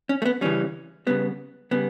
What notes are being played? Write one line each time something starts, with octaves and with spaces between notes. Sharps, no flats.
C#4
A3
B3
C#3 E3 G3 C#4
C#3 G3 B3
C#3 G3 B3